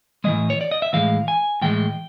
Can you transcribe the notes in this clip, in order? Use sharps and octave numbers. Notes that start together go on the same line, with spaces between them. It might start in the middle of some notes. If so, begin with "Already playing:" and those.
A2 E3 G#3 D#5
C#5
D5
D#5
E5
A2 E3 G#3 F5
G#5
A2 E3 G#3 G5